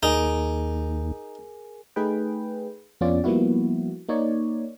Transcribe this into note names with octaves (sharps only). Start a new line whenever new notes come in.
D#2 D#4 G#4 A#4 G#5
A3 D#4 G#4 B4 G5
F2 B3 C#4 F4 D5
F3 G3 A#3 B3 E4 F#4
A#3 D#4 C#5 D5